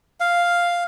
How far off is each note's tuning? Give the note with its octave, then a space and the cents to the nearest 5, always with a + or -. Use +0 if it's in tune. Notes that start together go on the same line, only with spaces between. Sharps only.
F5 +0